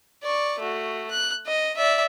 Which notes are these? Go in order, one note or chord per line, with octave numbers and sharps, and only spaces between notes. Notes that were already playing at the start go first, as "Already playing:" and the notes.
D5 C#6
A3 F#4
F#6
D#5
D5 E5